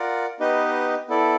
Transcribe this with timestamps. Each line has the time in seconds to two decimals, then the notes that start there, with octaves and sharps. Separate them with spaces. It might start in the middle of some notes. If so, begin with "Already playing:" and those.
Already playing: F4 A#4 D5 F#5
0.40 B3 D#4 G4 B4 D#5
1.08 B3 E4 A4 D5